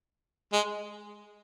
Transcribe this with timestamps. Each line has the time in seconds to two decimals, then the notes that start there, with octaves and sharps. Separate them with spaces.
0.53 G#3